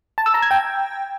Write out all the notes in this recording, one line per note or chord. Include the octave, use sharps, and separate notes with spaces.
A5
E6
A#5
G#6
G5